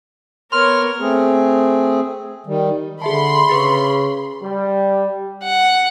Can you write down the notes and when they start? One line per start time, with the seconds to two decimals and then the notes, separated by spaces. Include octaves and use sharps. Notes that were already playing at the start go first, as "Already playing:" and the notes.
0.52 B3 A#4 C#5 C6 F6
1.00 A3 C4 G#4
2.47 D#3 G3
3.02 D3 G#4 E5 A5 B5 C6
3.49 C#3 G#4 B4 C#6
4.43 G3
5.43 F#5